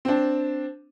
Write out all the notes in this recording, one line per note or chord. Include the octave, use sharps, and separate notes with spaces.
C4 D4